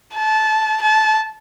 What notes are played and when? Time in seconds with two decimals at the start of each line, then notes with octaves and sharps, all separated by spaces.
0.15 A5
0.82 A5